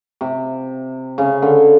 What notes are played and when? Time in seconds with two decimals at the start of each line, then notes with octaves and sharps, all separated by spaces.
0.21 C3
1.18 C#3
1.42 D3